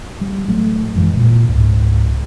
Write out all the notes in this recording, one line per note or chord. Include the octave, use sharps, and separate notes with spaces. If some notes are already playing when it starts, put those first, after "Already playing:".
G3
A1 F#3 A3
A1 F#2 E3 G#3
A#2
C#2 G#2